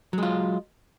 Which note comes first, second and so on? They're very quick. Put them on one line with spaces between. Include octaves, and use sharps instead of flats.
F#3 G#3 F4